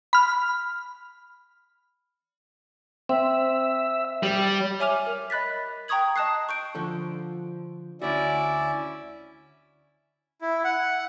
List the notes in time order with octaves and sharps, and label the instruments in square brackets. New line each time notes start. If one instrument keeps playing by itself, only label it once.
[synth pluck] B5 F6
[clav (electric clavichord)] C4 [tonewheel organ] E5
[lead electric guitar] G3
[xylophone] C#5 E5 G#5 D6 F6 F7
A#4
D#5 B5 F#6 A6 B6
G5 A#5 C#6 D#6 G#6 F#7
D#5 A5 D#6 F#6 C7
C#6 G6 D7
[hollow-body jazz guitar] D3 F3 A4
[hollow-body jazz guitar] D2 F#4 [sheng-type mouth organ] C#4 E4 E5 [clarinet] D5
[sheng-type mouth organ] E4
F#5